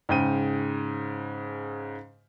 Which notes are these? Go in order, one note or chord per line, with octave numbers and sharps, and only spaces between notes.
G#2 C#3 G5 D#7